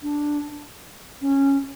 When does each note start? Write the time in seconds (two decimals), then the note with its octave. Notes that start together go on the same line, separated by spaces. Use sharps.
0.02 D4
1.21 C#4